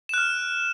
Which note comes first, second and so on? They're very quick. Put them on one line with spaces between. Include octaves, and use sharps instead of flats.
E7 F#6 F6